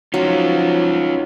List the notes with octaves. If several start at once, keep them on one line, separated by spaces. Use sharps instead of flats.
F3 F#3 C#4 D#4 F4 C#5